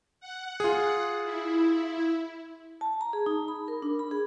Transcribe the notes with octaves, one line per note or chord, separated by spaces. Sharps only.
F#5
F4 G#4
E4
A5
A#5
G#4
D#4
B5
A#4
D4
B5
G#4